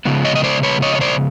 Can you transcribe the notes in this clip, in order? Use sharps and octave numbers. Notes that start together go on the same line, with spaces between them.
C#3 F3 G#3 B3
C#5 D#5
D#5
C5 D5
B4 C#5
C#5 D#5
C#5
C5 D5